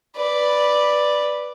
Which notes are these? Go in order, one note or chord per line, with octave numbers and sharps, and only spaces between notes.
B4 D5